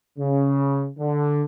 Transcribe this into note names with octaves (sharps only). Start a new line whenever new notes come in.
C#3
D3